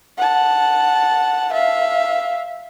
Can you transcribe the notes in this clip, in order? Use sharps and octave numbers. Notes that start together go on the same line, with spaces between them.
F#5 A5
E5 F5